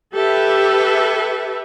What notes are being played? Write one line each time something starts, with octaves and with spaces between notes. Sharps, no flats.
G4 A4 B4 E5